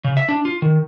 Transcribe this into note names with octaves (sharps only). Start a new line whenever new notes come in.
C#3
E5
D4
F4
D#3